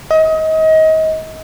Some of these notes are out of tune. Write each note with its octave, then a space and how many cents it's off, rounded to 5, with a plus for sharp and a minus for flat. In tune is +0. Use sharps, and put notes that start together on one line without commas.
D#5 +30